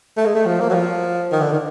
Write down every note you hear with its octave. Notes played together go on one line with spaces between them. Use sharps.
A3
G#3
A3
F3
A#3
F#3
F3
D#3
D3
D#3